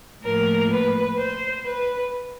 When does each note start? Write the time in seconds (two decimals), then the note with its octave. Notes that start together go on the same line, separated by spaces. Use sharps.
0.23 A2 F3 A#3 A#4
0.70 B4
1.18 C5
1.65 B4